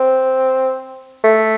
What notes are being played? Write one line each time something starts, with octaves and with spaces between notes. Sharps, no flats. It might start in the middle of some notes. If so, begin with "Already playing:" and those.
Already playing: C4
A3